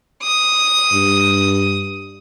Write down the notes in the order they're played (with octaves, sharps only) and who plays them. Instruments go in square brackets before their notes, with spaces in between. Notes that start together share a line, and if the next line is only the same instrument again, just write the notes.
[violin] D#6
[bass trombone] G2